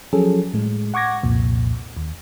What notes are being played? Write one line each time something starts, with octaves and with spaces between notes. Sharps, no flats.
F3 F#3 C#4 G#4 A4
A2 G#3
F#5 C#6 D6 G#6 A#6
C2 F2 A#2
D#2